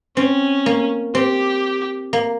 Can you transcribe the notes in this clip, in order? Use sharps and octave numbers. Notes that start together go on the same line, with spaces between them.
C4 C#4
A#3
C4 G4
A#3